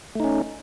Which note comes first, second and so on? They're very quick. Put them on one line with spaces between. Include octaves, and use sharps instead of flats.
A3 D#4 C#4